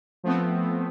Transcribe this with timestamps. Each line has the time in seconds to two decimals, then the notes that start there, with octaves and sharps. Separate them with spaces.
0.23 F3 A3 B3 C4